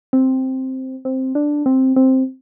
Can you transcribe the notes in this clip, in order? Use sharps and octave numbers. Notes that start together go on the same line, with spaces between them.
C4
C4
D4
C4
C4